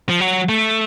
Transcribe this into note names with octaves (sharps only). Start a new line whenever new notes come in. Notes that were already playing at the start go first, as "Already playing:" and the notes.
F3
F#3
A3